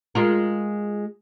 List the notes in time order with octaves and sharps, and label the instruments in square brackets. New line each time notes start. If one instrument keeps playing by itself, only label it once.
[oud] G#3 F4 A#4